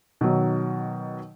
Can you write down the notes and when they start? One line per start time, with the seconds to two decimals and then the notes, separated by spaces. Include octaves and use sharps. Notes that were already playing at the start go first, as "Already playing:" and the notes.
0.21 B2 D#3 F#3